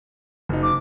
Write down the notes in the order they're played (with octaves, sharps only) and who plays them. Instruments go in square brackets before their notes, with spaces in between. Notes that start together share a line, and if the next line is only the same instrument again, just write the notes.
[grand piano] F#1 D#4
[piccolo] D6